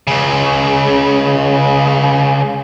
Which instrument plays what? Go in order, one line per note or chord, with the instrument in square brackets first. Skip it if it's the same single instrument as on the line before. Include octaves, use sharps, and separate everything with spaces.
[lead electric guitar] C#2 C#3